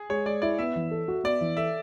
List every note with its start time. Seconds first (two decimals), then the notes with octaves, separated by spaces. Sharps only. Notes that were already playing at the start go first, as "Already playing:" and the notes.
Already playing: G#4
0.10 G#3 C#5
0.26 G#3 D5
0.42 E4 D5
0.59 B3 E5
0.76 E3
0.91 A4
1.08 F#4
1.24 B3 D5
1.41 E3
1.57 A4 E5